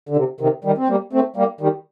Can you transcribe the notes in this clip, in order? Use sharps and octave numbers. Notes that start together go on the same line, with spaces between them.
D3
C3
C3 D#3
D#3 G3
C4
G3 A#3
A3 C4
G3 A#3
D#3 G3